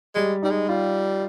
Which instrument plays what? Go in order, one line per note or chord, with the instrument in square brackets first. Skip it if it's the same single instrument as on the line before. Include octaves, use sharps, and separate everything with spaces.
[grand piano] G3 [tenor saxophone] G#3
[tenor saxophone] G3 [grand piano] D#4
[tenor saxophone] G#3
[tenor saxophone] G3 [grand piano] F4